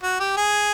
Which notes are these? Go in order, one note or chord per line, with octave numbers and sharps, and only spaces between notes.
F#4
G4
G#4